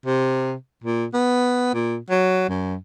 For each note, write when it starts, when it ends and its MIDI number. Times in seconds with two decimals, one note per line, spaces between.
0.06 0.54 48
0.84 1.06 46
1.14 1.72 59
1.74 1.97 46
2.10 2.49 54
2.49 2.76 42